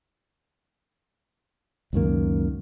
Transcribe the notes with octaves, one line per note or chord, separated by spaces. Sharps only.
C#2 F#2 D#3 A#3